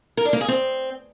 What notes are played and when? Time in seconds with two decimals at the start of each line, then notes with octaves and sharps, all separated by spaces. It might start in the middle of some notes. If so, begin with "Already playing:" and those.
0.17 A#4
0.25 D4
0.33 A#3
0.41 G#4
0.48 C4